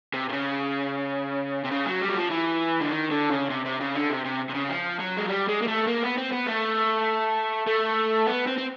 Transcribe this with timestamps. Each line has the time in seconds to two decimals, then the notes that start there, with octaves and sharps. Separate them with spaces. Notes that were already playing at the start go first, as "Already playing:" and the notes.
0.13 C3
0.29 C3
0.32 C#3
1.64 C3
1.71 C#3
1.87 F#3
2.02 G3
2.09 F#3
2.17 F3
2.31 E3
2.81 D3
2.91 D#3
3.11 D3
3.30 C#3
3.50 C3
3.65 C3
3.80 C#3
3.95 D3
4.10 C3
4.25 C3
4.50 C3
4.54 C#3
4.69 F3
4.99 F#3
5.17 G#3
5.28 G3
5.48 G#3
5.62 A#3
5.68 A3
5.88 A#3
6.04 B3
6.18 C4
6.33 B3
6.47 A3
7.67 A3
8.27 B3
8.47 C4
8.58 C4